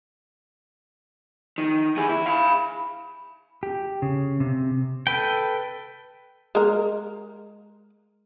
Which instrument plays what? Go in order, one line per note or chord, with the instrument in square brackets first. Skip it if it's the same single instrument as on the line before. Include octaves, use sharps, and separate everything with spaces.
[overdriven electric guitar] D#3
E3 G#4
E4
F5 B5
[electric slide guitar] G4
C#3
C3
[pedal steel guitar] A4 B4 G5
[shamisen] G#3 A#4